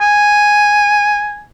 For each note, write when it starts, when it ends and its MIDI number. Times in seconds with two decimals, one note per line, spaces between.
0.01 1.43 80